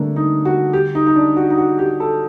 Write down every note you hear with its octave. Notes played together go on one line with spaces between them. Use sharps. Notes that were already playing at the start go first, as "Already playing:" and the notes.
Already playing: D3 G3 A3 A#3 C4 D4
D#4
F#4
G4
D#4
D#4
D4
F#4
D#4
F#4
G4
A4